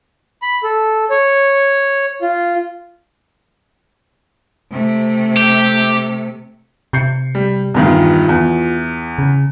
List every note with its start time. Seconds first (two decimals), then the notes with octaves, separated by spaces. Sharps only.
0.42 B5
0.63 A4
1.10 C#5
2.22 F4
4.72 C3 A3
5.37 G4
6.93 C3 G6 C7 C#7
7.35 G3
7.74 E2 G2 D#3
7.87 F4
8.29 E2
9.19 C#3